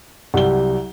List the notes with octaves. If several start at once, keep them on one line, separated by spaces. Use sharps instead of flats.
C2 F#3 G4 F#5 G7